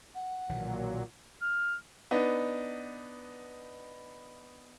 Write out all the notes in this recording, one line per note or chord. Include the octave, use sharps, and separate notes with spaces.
F#5
B1 A#2 D#3 E3 F#3
F6
B3 D4 D#4